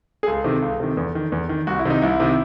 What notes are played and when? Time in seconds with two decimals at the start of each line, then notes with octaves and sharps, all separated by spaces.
0.23 G#4
0.27 C#2 A4
0.44 C3 D#3
0.62 C#2
0.80 C3 D#3
0.97 E2
1.15 D#3
1.32 E2
1.49 D#3
1.67 C2 F#4
1.79 E4
1.85 C3 D#3 D#4
2.02 C2 E4
2.20 C3 D#3